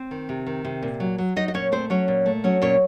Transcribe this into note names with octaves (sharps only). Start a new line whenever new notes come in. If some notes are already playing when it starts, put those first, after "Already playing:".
Already playing: C4 C5
D#3
C3
D#3
C3
A#2
F#3
F#3
F#3 D#4 D#5
D#5
A#2 C#4 C#5
A3 C4 C5
F#3 C#4 C#5
A#2
A3
F#3 C#4 C#5
A#2 C#4 C#5